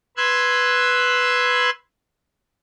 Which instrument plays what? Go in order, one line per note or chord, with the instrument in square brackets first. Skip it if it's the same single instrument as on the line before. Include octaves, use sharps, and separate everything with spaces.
[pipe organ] B4 C6 E6 F#6 G#6